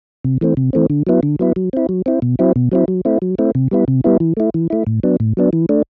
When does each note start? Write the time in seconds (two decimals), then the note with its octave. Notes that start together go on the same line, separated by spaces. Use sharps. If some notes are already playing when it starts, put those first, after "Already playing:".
0.24 C3
0.41 E3 A3 C4
0.57 C3
0.73 E3 A3 C4
0.90 D3
1.07 F#3 B3 E4
1.23 D3
1.39 F#3 B3 E4
1.56 F#3
1.73 C4 E4
1.89 F#3
2.06 C4 E4
2.22 B2
2.39 F#3 C4 E4
2.56 B2
2.72 F#3 C4 E4
2.88 F#3
3.05 A3 C4 E4
3.22 F#3
3.38 A3 C4 E4
3.55 C3
3.71 G3 B3 E4
3.88 C3
4.04 G3 B3 E4
4.20 E3
4.37 A3 E4
4.54 E3
4.70 A3 E4
4.87 A2
5.03 F#3 B3 D4
5.20 A2
5.37 F#3 B3 D4
5.53 E3
5.69 A3 D4